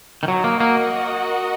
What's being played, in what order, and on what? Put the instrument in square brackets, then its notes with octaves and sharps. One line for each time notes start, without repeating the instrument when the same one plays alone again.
[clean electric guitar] D#3
[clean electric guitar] F#3 [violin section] F#4 A#4 D#5 F#5
[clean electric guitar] A#3
A#3